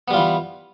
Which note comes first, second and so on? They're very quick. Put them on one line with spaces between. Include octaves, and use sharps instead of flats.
B3 G3 F4 E3